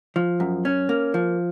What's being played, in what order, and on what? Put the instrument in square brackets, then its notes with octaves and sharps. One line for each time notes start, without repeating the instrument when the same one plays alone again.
[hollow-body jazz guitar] F3
F#2
C#4
A#3
F3